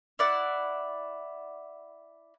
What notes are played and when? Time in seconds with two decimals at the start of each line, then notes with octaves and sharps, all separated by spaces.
0.19 E4 D5 F#5